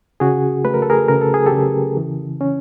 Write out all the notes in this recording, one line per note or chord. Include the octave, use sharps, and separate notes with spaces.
C#3 F#4 G#4
A3 B4
A#4
A4
G#4 A#4
C#3 A#4
A4
G#4
G4 A4
C#3
E3
C#4